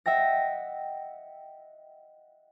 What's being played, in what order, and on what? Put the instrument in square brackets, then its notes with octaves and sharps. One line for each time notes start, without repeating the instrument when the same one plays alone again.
[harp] D#5 E5 F#5 G5 A#6